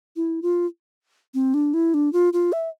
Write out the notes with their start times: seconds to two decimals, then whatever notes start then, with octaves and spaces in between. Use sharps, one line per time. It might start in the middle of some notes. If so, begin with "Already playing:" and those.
0.16 E4
0.42 F4
1.34 C4
1.54 D4
1.74 E4
1.94 D4
2.13 F4
2.33 F4
2.52 E5